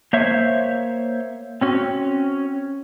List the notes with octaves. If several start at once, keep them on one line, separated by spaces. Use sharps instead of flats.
A#3 C5 C#5 E5
C4 C#4 F#4